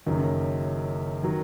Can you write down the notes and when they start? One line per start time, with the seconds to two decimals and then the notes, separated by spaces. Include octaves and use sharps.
0.06 F#1 F#2 D#3
1.23 D#3 F#3